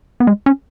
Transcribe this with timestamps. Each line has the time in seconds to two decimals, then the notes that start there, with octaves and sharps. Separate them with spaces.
0.20 B3
0.27 G#3
0.46 C#4